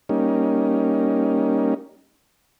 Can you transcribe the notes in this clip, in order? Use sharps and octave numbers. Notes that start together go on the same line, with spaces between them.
G3 A#3 C#4 D#4